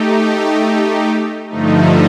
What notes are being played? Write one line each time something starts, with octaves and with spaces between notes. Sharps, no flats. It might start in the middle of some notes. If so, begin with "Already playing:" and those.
Already playing: A3 D#4 G4
G2 D3 F3 A3 D#4